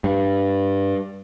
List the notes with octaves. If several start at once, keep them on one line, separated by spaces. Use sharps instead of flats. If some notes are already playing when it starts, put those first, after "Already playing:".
G2